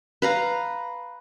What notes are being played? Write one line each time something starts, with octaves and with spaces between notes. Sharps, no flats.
B4 F5 A#5